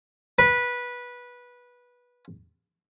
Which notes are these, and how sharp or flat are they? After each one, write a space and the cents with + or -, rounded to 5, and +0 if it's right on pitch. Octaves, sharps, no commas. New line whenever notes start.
B4 -15